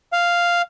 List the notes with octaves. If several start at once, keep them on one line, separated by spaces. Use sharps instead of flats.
F5